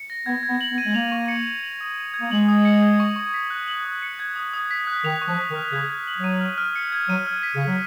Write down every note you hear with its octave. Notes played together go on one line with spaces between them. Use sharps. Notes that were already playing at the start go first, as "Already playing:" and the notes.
Already playing: C#7
A#6
B3 G#6
G#6
B3
F#7
B3
D#7
G#3
A#3 F7
C#6
C#7
G#6
F#7
D#6
D#7
G#6
A#3
G#3 F#7
D#6
C#7
G#6
C#6
C#6
B6
F#6
F#7
D#6
C#7
G#6
D#6
D#6
B6
F#6
D#3 F7
C#6
F3
B6
D#3
F6
C#3 G#6
G#6
F#7
F#3
D#7
F6
F6
C#7
G#6
F#3 D#7
F6
B6
C#3
G#6
F#3